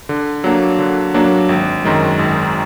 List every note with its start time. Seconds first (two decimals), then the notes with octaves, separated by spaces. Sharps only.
0.09 D3
0.44 F#3 A#3 D4 F#4
0.79 D3
1.14 F#3 A#3 D4 F#4
1.49 G#1
1.84 F#2 D#3 G#3
2.19 G#1